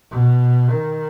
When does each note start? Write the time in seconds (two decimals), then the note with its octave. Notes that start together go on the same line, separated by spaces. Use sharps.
0.11 B2
0.70 D#3